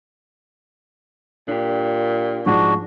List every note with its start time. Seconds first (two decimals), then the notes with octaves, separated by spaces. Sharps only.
1.48 A#2 D4 G4
2.46 G#2 F3 D4 F#4